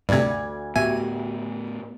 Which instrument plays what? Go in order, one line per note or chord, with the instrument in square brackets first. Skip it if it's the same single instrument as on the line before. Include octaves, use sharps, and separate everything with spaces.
[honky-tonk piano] D2 G#6 [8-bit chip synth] G2 C3 [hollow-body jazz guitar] D5
[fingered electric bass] A2 B3 [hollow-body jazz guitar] F#4 G4 E5 [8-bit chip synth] G#5